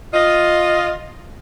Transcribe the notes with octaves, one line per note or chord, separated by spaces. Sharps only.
F4 D#5